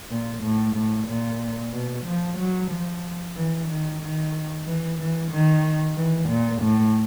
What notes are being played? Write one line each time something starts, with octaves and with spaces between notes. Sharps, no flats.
A#2
A2
A2
A#2
B2
F3
F#3
F3
E3
D#3
D#3
E3
E3
D#3
E3
A#2
A2